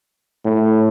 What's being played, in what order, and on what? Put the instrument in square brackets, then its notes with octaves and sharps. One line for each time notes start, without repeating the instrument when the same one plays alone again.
[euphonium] A2